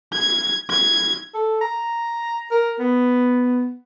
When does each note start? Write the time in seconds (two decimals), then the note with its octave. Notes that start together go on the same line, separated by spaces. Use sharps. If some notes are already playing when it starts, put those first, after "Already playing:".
0.13 G#6
0.70 G#6
1.34 A4
1.61 A#5
2.51 A#4
2.79 B3